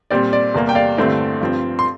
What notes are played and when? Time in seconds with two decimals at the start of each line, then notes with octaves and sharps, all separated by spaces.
0.10 A#2 G3 C4 D5
0.33 D5
0.54 E2 C3 G3 A#3
0.69 G5
0.75 D5 F5
0.97 G2 D3 A3 C4 E4
1.41 G2 F3 C4
1.79 C6